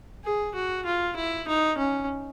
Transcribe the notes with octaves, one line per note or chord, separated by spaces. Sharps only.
G#4
F#4
F4
E4
D#4
C#4